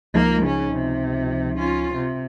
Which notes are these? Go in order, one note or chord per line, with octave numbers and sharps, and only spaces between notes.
C#2 F3 A#3 D#4 A#4
C#3 C#4
C3
C#4 F4
C3